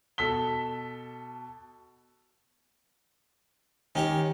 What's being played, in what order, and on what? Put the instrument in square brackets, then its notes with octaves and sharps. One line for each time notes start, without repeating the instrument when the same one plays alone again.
[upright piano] B2 A4 E6 B6 G7
[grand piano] D#3 [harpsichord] C#4 G4 C#5